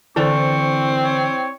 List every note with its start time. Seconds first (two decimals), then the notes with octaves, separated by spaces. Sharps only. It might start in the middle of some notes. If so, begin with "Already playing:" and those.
0.16 D3 E3 C4 E4 A4 C5 D5 C#6
1.04 C#5